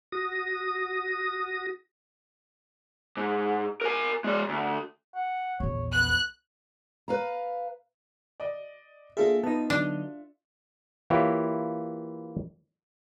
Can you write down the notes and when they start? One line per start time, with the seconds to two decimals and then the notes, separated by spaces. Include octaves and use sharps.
0.12 F#4 D#6 A#6
3.17 G#2
3.81 A#4 G#5
4.24 G#3 D5
4.49 D2
5.15 F#5
5.60 A#1 E2 C#5
5.92 B3 F#6
7.08 B4 F5 A#5
8.40 D5 D#5
9.17 A#3 D4 F4 G#4 A4 E5
9.44 B3 D#4 B4 A5
9.70 D3 F#3 D4
11.10 E3 A#3 E4 F4 G4 C#5